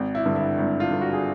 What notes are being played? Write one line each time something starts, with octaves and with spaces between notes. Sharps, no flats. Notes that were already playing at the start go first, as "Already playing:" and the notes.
Already playing: G#1
E4
G2 D3
E4
G#1 E4
F4
G2 D3
F#4
G#4